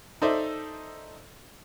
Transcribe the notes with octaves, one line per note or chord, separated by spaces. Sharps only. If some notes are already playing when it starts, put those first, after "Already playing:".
D#4 A4 C5 D5 E5